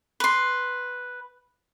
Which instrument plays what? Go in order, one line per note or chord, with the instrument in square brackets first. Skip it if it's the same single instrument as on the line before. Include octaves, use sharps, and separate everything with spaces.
[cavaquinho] B4 C6